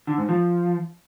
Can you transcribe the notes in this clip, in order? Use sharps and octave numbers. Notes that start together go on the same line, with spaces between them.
D3
G#2
F3